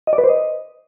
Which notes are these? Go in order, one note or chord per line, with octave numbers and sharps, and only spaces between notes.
D#5
D5
B4
C5
D#5